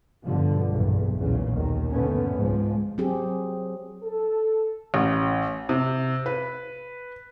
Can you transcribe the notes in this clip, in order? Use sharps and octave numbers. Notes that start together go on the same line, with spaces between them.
G2 B2 D3 F3
B1 E2 G2 A#2
B1 E2 A#2 C#3
D#2 D#3
G2 B2 D3 A3 B3 C#4
C#2 G#2 F3 G#3
F#3 C4 G4 G#4
A4
A1
C3
B4